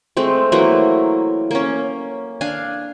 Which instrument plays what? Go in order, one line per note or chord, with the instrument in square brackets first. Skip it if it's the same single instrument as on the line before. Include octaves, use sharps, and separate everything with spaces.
[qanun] G#3 A3 C4
E3 F#3 A3 A#3
A#3 C#4
D4 F5 G#5